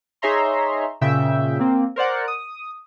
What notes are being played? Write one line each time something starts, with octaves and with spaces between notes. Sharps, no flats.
D#4 G#4 C#5 E5 A#5 C6
A#2 C#3 E5 G5
A#3 C4
A#4 C5 D5 F#5
D#6